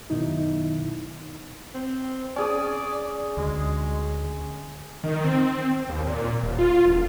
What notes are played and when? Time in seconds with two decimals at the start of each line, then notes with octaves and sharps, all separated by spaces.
0.10 F#2 B2 D#3 D#4 E4
1.74 C4
2.36 C#4 G#4 D5 D#6
3.37 D2 G#3
5.04 D#3
5.24 C4
5.89 D#2
6.07 A#2
6.43 D#1
6.59 F4
6.86 E1